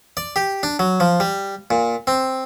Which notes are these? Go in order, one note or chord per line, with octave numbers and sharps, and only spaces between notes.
D5
G4
D4
F#3
F3
G3
A#2
C4